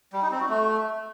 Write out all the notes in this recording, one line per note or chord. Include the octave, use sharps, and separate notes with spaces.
G3
D#4
C4
F#4
A3